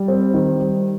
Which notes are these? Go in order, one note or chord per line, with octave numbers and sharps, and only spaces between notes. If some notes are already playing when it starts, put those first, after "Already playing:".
Already playing: G3
C4
D#3
G3